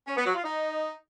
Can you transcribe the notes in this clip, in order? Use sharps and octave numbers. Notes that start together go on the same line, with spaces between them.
C#4
B3
F#3
F4
D#4